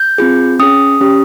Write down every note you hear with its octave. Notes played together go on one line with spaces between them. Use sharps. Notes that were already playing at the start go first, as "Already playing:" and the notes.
Already playing: G6
C4 F4 G#4
C#4 G#4 D#6
C#4 G4